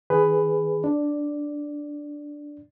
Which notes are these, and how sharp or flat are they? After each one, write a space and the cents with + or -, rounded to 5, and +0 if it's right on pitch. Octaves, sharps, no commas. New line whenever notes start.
D#3 +30 G#4 +0 B4 +10
D4 +0 D5 +0